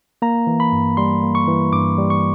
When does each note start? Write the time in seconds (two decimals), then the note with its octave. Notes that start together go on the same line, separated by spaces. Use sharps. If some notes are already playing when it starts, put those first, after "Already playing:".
0.22 A#3 A#5
0.47 E3
0.60 B5
0.72 G2
0.97 G3 C6
1.23 A#3
1.35 C#6
1.47 E3
1.73 G2 D6
1.98 G3
2.10 C#6